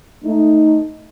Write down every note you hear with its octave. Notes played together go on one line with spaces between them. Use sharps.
A3 D#4